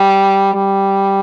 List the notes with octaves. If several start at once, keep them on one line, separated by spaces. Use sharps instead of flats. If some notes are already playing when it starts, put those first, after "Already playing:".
Already playing: G3
G3